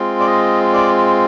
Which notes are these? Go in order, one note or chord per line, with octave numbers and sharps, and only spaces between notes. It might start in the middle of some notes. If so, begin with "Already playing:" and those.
Already playing: G#3 C4 F4
D5
D#5
D5